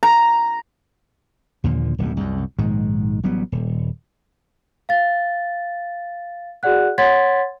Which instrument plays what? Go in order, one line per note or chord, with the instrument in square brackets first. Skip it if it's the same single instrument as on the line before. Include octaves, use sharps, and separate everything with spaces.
[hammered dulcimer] A#5
[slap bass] D#2 A#2 D3 F3
D1 B1 G2
C2 F#2
A#1 G#2 D#3 G#3
A1 F#3 G3 B3
D#1
[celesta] F5 A6
F#4 G#4 D5 F#5 F#6
C#5 F#5 C6 G#6 A6 B6